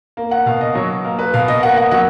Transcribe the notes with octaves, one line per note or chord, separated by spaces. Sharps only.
A#3
F#5
B2 F5
D#5
F#3 C#5
A#3 A#4
B4
B2 F5
D#5
A#3 F#5
F#5
F#3 F#5